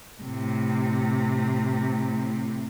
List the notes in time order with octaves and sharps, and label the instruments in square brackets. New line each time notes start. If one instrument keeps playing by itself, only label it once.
[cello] A2 C3